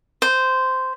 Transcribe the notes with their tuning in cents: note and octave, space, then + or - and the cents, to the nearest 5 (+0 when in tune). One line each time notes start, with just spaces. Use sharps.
C5 -10